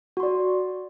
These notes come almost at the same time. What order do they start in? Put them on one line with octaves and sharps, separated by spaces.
F#4 C6 D5